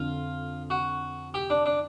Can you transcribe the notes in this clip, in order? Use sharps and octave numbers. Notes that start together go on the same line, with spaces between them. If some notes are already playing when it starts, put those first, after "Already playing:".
Already playing: F2 D3 F4
F#4
G4
D4
D4